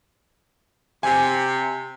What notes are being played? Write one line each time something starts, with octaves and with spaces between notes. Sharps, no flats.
C3 G#5